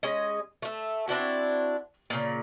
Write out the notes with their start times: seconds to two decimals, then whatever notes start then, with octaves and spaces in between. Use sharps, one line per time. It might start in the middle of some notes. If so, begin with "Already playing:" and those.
0.03 G#3 C#4 D#5
0.62 A3 E5
1.08 C4 D4 E4 F#4
2.10 A#2 C#3